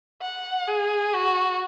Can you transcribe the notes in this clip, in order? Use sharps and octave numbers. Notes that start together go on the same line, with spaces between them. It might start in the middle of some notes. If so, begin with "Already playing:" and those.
F#5
G#4
F#4